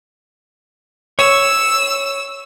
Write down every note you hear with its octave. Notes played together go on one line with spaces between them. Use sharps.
C#5 E6